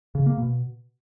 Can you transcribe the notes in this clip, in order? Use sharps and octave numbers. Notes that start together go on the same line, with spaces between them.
C#3
A#3
B2